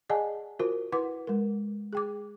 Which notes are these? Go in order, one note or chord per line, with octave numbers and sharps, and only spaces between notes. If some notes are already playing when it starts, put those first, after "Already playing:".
G#4 D5 D#5 F#5 G#5 A5
F4 F#4 A#4 C5
E4 B4 F#5 D6
G#3 A#4
G#4 G5 D6